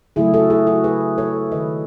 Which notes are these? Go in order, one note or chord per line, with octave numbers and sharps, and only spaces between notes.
C#3 F#3 A3 E4 G#4
F#4 A4
E4 G#4
F#4 A4
G#4 B4
A4 C#5
D#3 G#3 B4 D#5